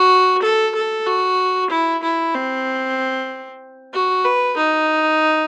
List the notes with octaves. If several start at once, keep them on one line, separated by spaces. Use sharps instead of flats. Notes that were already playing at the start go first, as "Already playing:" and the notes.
Already playing: F#4
A4
A4
F#4
E4
E4
C4
F#4
B4
D#4